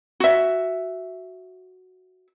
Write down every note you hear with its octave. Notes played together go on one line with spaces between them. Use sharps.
F#4 E5